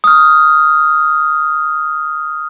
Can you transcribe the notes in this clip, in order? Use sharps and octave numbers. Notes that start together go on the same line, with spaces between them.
D#6 F6